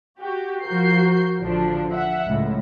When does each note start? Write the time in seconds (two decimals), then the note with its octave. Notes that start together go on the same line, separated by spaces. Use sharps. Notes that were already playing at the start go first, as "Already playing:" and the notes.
0.20 F#4 G4
0.64 F3 F#4 A#4 G6 C7
1.39 A1 D3 F3 D4
1.93 E5 F#5
2.27 C#2 A2